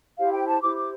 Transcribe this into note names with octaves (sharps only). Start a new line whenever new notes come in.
E4 G4 C5 F5
G5
A5
E4 G4 C5 D6
D6